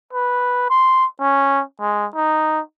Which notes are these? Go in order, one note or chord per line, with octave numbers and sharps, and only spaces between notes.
B4
C6
C#4
G#3
D#4